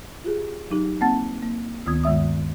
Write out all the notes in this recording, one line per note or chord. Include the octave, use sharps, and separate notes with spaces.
F4 G4 G#4
F#3 D#4 G4
A#3 C4 F#5 A5 A6
A#3
D2 D#3 B3 F4 D#6 G#6
G2 D#3 G#3 E5 D#6